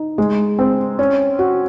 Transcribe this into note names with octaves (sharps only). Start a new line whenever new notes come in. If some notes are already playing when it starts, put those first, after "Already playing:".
Already playing: D#4
G#3
C4
C#4
F#4